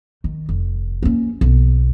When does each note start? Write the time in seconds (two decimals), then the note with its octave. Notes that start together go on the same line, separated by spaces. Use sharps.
0.24 D#3
0.49 F1
1.03 A#3 C#4
1.41 B1